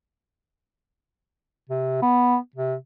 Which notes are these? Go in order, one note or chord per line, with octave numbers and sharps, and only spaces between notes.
C3
B3
C3